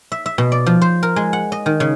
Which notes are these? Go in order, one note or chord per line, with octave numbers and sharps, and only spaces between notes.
E5
E5
B2
D5
F3
C5
A#4
G#3
F#5
D#5
D#3
C#3